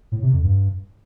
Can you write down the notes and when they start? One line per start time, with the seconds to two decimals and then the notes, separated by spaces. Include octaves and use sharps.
0.12 A2
0.22 C3
0.33 F2
0.44 G2